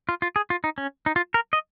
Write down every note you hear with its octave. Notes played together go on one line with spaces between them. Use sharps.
F4
F4
G#4
F4
D#4
C#4
D#4
F4
A#4
D#5